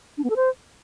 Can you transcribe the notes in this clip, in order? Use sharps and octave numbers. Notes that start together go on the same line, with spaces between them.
D4
B3
A4
C5